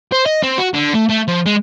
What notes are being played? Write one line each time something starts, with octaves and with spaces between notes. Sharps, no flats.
C5
D#5
C4
F#4
D3
A3
A3
F3
G#3